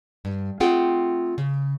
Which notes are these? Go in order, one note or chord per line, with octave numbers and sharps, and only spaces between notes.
G2
A3 C4 F4 G#4 F#5 G5
C#3